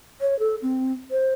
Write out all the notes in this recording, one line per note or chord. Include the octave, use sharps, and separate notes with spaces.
C#5
A4
C4
C5